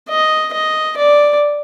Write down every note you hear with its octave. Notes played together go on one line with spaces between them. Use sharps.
D#5
D#5
D5